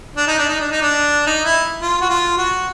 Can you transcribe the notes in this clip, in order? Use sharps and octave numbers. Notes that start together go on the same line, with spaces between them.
D4
D#4
D4
D#4
D4
D#4
D4
D#4
E4
F4
F#4
F4
F#4